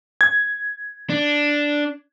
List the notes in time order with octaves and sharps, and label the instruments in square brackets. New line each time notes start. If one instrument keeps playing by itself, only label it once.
[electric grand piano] G#6
[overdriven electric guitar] D4